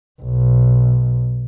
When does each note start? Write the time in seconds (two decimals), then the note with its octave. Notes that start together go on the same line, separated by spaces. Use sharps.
0.22 B1